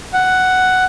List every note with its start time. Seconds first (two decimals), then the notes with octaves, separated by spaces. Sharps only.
0.13 F#5